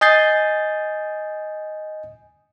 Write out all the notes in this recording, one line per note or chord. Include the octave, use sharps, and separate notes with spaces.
D#5 G#5 D#6 G6 A6 C7